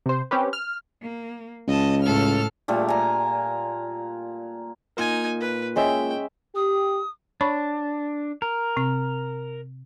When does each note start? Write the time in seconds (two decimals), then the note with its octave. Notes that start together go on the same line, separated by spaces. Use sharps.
0.06 C3 C5
0.31 C4 C#4 G4 B4
0.53 F6
1.03 A#3
1.68 C#2 D#5 A5
2.03 A2 A4 F6
2.68 A#2 G3 A3
2.88 G#5 A#5
4.97 A#3 D#4 F4 A#4 G#5
5.41 B4
5.76 G#3 C#4 E5 G5
6.55 G4 D#6
7.41 D4 C#5 B5 C#6
8.42 A#4
8.77 C3 C4